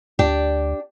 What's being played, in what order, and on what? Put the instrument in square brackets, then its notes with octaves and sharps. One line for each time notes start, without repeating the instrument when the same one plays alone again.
[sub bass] D2 [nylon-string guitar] D4 G4